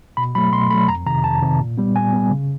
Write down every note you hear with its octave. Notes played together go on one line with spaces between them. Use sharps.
B2 B5
F#3 A3 B5
B2 C6
F#3 A3 B5
F2 A#5
C3 D#3 A#5
F2 A5
C3 D#3
A#2
G3 B3
A#2 G#5
G3 B3
C#3